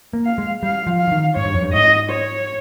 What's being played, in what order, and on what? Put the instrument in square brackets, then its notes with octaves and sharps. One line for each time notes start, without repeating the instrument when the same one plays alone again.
[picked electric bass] A#3
[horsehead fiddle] F5
[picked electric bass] G#3
[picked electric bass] G3 [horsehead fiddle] F5
[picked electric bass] F3
[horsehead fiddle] F5
[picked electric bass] F3
D#3
[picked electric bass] G#2 [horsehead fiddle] C#5
[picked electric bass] G2
F2
G2
[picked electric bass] G#2 [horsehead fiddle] D#5
[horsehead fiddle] C#5